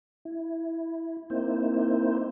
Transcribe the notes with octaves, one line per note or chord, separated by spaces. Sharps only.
E4
A#3 C4 D#4 E4 C5